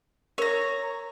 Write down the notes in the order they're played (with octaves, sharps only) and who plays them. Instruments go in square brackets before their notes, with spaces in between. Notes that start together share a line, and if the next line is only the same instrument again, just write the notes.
[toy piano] A#4 [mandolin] C#5 A#5